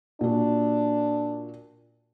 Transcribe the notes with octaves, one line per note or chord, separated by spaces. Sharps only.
A#2 D4 F#4